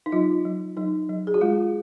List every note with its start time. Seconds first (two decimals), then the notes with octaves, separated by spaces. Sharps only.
0.06 D#4
0.12 F#3 F4
0.45 F#3
0.77 F#3 D#4
1.09 F#3
1.27 G#4
1.34 F#4
1.41 G#3 F4